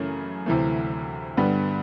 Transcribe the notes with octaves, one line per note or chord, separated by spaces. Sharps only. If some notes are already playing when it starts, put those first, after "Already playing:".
Already playing: F#2 C#3 E3 A3 C#4
D2 C3 E3 A3
G2 D3 G3 B3